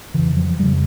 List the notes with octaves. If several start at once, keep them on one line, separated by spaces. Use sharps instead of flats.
F2 C#3 E3
F3
F2 C#3 G3